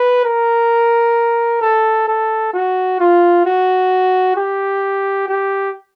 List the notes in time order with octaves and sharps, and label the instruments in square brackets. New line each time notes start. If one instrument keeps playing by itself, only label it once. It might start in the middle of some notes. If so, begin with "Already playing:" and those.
Already playing: [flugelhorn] B4
A#4
A4
A4
F#4
F4
F#4
G4
G4